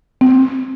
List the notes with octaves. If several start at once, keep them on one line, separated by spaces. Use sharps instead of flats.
C4